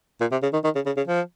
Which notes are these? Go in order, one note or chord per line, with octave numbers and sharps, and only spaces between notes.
A#2
C3
C#3
D#3
D#3
C#3
C#3
C#3
F3